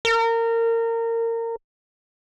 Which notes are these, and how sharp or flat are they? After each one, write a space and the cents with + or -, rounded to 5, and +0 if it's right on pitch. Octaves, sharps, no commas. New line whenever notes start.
A#4 -25